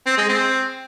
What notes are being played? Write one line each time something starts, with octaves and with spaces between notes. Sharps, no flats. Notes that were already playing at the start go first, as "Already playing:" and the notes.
C4
G#3
C4